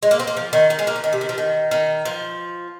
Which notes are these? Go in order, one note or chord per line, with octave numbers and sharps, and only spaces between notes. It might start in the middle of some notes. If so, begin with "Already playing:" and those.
G#3
A#3
C4
A#3
F3
D#3
D#3
G#3
A#3
F3
D#3
C3
D#3
F3
D#3
D#3
F3